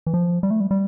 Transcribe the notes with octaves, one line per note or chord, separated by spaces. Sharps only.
E3
F3
G3
A3
G3
G3